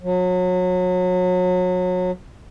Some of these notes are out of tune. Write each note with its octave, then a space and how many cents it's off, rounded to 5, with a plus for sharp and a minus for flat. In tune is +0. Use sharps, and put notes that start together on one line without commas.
F#3 -30